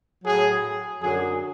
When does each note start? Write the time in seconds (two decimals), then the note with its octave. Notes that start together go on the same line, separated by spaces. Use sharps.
0.24 A2 F#3 G#4
1.02 F#2 D3 F#3 G#4